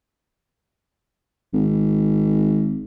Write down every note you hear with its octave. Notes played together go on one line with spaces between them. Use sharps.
G#1